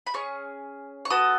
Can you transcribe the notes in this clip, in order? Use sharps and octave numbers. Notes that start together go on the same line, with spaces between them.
B5
C#4 G#4 C#6
C#6
B3 F#4 A4 D#6